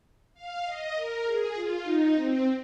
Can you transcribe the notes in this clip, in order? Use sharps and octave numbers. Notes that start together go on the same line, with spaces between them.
F5
D#5
A#4
G#4
F4
D#4
C4